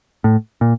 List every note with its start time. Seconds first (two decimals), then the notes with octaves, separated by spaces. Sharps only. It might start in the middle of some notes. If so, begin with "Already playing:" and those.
0.24 A2
0.61 A#2